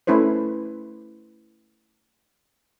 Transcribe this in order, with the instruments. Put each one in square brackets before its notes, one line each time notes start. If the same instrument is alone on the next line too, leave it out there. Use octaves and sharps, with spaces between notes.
[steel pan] A3 C#4 E4 B4 C5